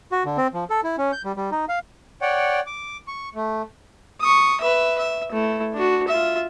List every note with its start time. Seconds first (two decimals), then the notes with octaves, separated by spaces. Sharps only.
0.12 F#4
0.25 D3
0.37 C4
0.54 F3
0.70 A4
0.84 E4
0.98 C#4
1.12 G6
1.24 G3
1.37 G3
1.52 D#4
1.69 F5
2.22 C#5 D5 F#5 G5
2.67 D6
3.08 C#6
3.35 A3
4.21 C#6 D#6
4.61 B4 E5
4.99 E5
5.32 A3 E4
5.74 D4 F#4
6.08 F4 E5